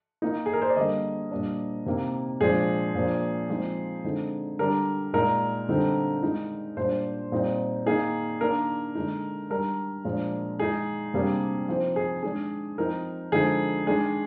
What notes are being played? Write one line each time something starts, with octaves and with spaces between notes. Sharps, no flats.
D#3 A#3 D#4
G#4
A#4
C5
D5
D3 G3 A#3 D#5
A#2 G3 A#3 D4
C3 D#3 A#3
A#2 F3 G#3 D4 G#4
A#2 F3 A#3 D4
F3 G#3 C4 D#4
D3 G#3 C4 D#4
D3 G3 D4 A#4
A#2 G#3 D#4 A#4
D3 G3 C4 D#4
D#3 G#3 D#4
A#2 G3 D4 C5
A#2 G3 C4 D#4
D#3 A#3 D#4 G#4
D#3 A#3 D4 A#4
D3 G#3 D#4
D#3 G3 D4 A#4
A#2 F3 G#3 D4
D#3 G#3 D#4 G#4
C3 G3 A#3 D4
F3 C4 D#4
G#4
D#3 G#3 D4 G#4
F3 C4 D#4 A#4
D3 F3 G#3 D#4 G#4
D#3 G#3 D4 G#4